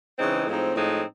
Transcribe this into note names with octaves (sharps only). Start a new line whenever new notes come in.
C#3 E3 G#3 C4 D#4
A2 F3 G#3 C4 D#4
A2 F3 G#3 C4 D#4